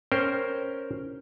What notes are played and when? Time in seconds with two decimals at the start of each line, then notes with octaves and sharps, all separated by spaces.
0.12 C#4 A#4 C5 G5